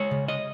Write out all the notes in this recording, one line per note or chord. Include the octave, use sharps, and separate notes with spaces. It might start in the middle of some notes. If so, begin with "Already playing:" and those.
Already playing: G#3 C#5
C#3
D#5